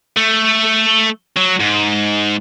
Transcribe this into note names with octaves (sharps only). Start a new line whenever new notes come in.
A3
F#3
G#2